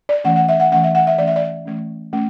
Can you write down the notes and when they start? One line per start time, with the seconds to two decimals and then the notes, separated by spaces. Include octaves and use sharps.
0.09 D5
0.24 E3 A3 C#4 F#5
0.36 F#5
0.49 E5
0.60 F#5
0.71 E3 A3 C#4 F#5
0.83 E5
0.95 F#5
1.07 E5
1.18 E3 A3 C#4 D5
1.27 E5
1.36 D5
1.66 E3 A3 C#4
2.13 A3 C#4